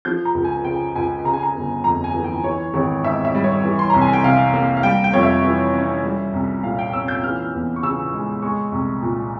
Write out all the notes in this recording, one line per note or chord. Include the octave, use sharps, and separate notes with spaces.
F3 G6
A#5
C#2
G#5
C#3 G5
C#2 G#5
C#3 A#5
G#5
A#5
G1
F2 A#5
G#5
E3
G5
E3 C#5
G#1 C#5
G#2 E5
E5
G3
C#5
E3
C6
C2 A#5
G#5
G5
C3 F5
A#3
F5
G3 G5
G5
F2 C#5
E5
E3
C#4
G3
C2
A#2 F5
G5
C#4 E6
G6
E3 F6
E2
C#6
C#3 E6
G#3
G#3 C#6
C2
A#2